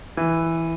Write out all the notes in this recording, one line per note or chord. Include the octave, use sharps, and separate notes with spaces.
E3